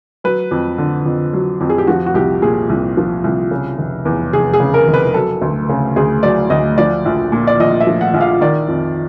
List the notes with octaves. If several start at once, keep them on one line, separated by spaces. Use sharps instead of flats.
F#3 B4
F2
D3
F2
F#3
F2
G#4
G4
F3 F#4
F#4
C2 G4
A#2 G#4
C2
F3
C2
C#3
F1
E2
F1 G#4
G#4
C#3
A#4
F1
B4
F#3 A4
D2
C#3
D2 G#4
F#3 D5
D2 D#5
F3 D5
A#1
A#2
D5
A#1 D#5
E5
F3
F#5
A#1
F5
D#3 D5
F2